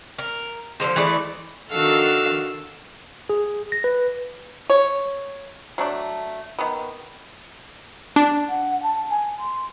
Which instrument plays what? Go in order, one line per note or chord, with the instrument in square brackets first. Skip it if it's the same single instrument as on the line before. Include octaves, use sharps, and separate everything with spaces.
[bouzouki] A#4
D3 F3 G#3 C5
E3 G#3 A3 D5
[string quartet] D#3 D4 F#4 A4 F5 E6
[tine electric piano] G#4
A#6
B4
[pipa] C#5
F#3 A3 D4
D#3 B3
[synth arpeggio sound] D4
[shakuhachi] F#5
A5
G#5
C6